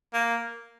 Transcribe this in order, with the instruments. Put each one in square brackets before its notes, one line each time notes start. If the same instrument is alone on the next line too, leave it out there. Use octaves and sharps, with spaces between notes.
[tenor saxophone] A#3